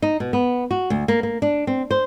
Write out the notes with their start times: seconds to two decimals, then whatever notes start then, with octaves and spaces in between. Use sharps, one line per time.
0.02 D#4
0.20 B2
0.33 B3
0.71 F#4
0.90 D2
1.08 A#3
1.23 A#3
1.42 D4
1.67 C4
1.91 C5